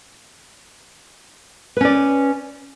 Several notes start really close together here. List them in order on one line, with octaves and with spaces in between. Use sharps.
B4 C#4 D5